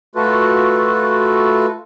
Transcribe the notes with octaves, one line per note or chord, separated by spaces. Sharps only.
A3 F4 F#4 A4 B4